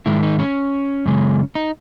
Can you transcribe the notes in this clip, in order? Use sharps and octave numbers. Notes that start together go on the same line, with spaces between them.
G#2 D#3 G#3 E4
D#4
C#4
F#2 C#3 G#3
D#4